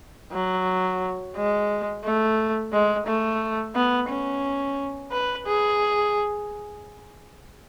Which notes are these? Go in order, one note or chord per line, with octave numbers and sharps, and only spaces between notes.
F#3
G#3
A3
G#3
A3
B3
C#4
B4
G#4